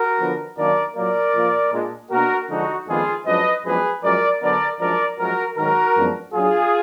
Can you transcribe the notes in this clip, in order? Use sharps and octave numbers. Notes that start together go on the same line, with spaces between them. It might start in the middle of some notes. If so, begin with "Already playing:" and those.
Already playing: F#4 A#4
D3 F3 B3 D4
F#2 D#3 A#3 D4 A#4 D5
A#2 F#3 A#3 A#4 D5
A#2 F3 A#3
A#2 G#3 D4
B2 A#3 D4 F#4 A#4
D3 F3 G#3 D4 D#4 F#4
F2 D#3 G#3 B3 D4 F4 G#4
F#2 F3 G#3 D4 B4 D#5
F#2 F3 G#3 B3 D4 G#4 B4
F#2 F3 G#3 A#4 D5
D3 F#3 B3 D4 A#4 D5
F#2 F3 G#3 D4 A#4 D5
F#2 F3 G#3 F#4 A#4
G#2 D#3 F#3 F#4 A#4
F#2 F3 G#3 B3 D4
A#2 F#3 D4 F4 G#4